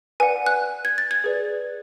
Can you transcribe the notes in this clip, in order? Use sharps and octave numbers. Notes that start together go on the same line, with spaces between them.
B4 D5 F#5 G#5
F#6
G#6
A6
G#6
G#4 B4 D5